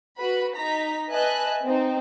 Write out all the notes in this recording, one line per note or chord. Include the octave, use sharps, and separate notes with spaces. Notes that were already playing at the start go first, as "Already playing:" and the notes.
F#4 B4 B5
D#4 A#5 B6
B4 D#5 E5 G#5 A5 F#6
C4 D#4